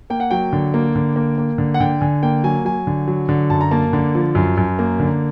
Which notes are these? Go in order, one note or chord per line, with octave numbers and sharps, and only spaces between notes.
A#3 G5
F#5
F#3 G5
D3
A#3
D3
A#3
A#3
D3
F#5
D3 G5
D3 G#5
A#3 G5
F#3 G#5
F#3 G#5
D3
F#3
D3
F#2 A5
A#5
A#3 A5
D3
F3
F#2
F#2
A#3
D3